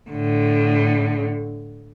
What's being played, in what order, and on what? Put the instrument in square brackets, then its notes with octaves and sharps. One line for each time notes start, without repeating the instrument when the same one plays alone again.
[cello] A2 D3